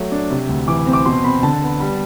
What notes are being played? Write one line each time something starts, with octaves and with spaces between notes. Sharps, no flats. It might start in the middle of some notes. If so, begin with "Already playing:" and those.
Already playing: F#3 A3
D4
C3
D2
E3 D6
C4
D6
B2 C6
C4 B5
D3 A5
B3
G3